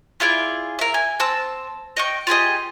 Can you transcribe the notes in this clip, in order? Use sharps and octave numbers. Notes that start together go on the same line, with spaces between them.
E4 F4 G#4 D5
A#4 E5
G#5
C4 A5 E6
D#5 G5 C#6
F4 G4 G#4 D#5